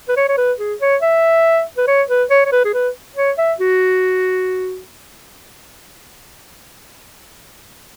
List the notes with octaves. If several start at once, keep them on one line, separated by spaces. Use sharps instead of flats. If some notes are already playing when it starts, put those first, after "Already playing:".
B4
C#5
C#5
B4
G#4
C#5
E5
B4
C#5
B4
C#5
C#5
B4
G#4
B4
C#5
E5
F#4